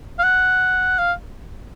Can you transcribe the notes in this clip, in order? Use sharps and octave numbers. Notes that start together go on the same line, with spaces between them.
F5
F#5
F5